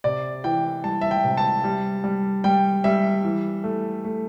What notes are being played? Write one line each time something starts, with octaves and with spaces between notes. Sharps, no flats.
C3 D5
E3 G5
G3 A5
E5
G5
C3
A5
G3
G3
G3 G5
G3 E5
E3
A3
A3